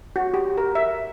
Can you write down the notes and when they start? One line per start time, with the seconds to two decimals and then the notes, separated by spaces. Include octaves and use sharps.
0.16 F#4
0.34 G4
0.58 A#4
0.75 E5